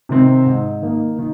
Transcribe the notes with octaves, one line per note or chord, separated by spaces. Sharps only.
C3 D#3 C4
G#2
D#3 A#3 D#4
D#3